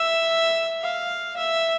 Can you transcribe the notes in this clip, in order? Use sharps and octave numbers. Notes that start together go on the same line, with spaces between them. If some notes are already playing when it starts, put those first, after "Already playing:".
Already playing: E5
F5
E5